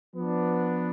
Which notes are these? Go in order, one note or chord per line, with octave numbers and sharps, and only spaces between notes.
F3 B3 D4